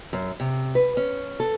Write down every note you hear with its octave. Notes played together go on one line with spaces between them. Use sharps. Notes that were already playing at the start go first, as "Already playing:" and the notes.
F#2
C3
B4
C#4
A4